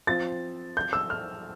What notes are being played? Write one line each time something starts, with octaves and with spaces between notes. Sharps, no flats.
F3 C4 F4 A6
G6
E6
F6